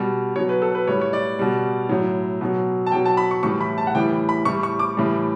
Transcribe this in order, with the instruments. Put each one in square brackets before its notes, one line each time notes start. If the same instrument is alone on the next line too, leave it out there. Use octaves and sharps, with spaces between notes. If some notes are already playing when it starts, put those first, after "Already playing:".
Already playing: [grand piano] B2 G3
B2 F#3 C#5
B4
A4
B4
A2 G3 C#5
C#5
D5
B2 G3
A2 F#3
B2 F#3
A5
B2 F#3 G5
A5
B5
C#6
A2 E3 G3 C#6
B5
A5
F#5
A2 E3 G3 G5
B5
A2 G3 C#6
C#6
D6
A2 E3 G3